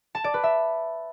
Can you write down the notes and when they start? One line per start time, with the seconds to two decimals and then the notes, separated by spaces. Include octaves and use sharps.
0.15 A5
0.24 D5
0.34 B4
0.43 E5